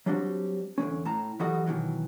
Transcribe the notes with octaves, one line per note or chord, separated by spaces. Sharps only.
F#3 G3 C4 D4 D#4 F#4
E2 D3 F#3 C#4
A2 A5 A#5
E3 F#3 G3 F#4 A4 D#5
B2 D#3 E3 F#3